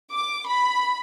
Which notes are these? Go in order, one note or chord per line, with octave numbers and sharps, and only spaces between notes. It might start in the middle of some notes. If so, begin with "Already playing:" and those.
D6
B5